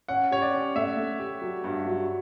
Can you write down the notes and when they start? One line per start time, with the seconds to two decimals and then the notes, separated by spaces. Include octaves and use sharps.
0.08 C#4 F#5
0.31 G4 C#5
0.42 D5
0.53 C#4
0.75 A3 E5
0.97 A3
1.20 G4
1.41 F#3
1.64 G2
1.86 F#3